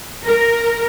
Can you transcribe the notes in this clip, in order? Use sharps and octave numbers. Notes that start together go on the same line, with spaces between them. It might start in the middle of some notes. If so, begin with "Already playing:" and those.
A#4